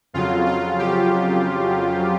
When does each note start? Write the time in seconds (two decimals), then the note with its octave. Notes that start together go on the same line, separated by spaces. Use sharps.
0.14 F2 C#3 F#3 F4
0.46 F4
0.79 G4